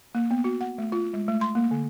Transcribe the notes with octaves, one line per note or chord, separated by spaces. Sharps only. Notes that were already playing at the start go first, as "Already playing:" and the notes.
A#3
B3
F#4
F#5
A3
F4
G#3
A3
C6
A#3
D3